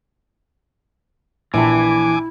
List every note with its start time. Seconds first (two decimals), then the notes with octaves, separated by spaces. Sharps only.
1.54 A#1 E3 E4 G#5 A5 D6